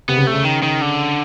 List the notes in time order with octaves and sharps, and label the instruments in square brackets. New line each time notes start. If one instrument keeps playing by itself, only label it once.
[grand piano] C3 [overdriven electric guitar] B3
[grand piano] C#3
C3
[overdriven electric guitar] A3
[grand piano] C#3
[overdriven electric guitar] D#3
D#3
D3